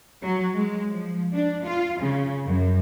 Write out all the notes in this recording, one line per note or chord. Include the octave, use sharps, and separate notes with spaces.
F#3
G#3
F3
D4
F4
C#3
F#2